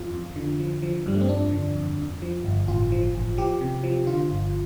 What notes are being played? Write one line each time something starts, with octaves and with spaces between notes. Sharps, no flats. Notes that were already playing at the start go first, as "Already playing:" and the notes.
Already playing: F2 F4
F2
D3
F3
F3
G2 G3
A3
C4
F2 D4
D3
F2
F2
F3
G1
A1 F4
F3
A1
F3 G4
C3
F3
D3 F4
G1